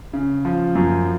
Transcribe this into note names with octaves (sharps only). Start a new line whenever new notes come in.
C#3
F3
F#2